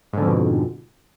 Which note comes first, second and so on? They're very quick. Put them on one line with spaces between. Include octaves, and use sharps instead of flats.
G#2 D3 F2 B2